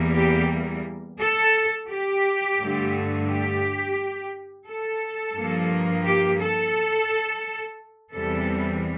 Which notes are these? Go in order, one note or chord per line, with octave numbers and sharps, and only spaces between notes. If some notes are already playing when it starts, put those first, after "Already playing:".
Already playing: E2 E3 G3 A#3
G4
A4
G4
G2 D3 A3
G4
A4
G2 F3 A#3
G4
A4
E2 C3 E3 G3 A4